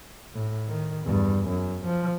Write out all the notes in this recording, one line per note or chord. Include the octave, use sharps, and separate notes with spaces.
A2
D#3
E2 G2
F#2
F3